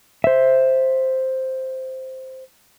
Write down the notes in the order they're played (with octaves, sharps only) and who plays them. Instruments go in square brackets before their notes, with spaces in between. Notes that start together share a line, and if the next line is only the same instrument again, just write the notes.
[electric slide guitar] C5 E5